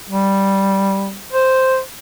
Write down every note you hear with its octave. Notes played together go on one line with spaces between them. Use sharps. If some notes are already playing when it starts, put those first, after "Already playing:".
G3
C5